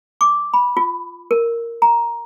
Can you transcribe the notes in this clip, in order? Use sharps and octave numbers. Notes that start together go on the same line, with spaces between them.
D6
B5
F4
A#4
A#5